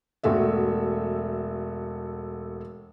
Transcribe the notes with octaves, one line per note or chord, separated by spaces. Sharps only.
E1 A3 F#4 E5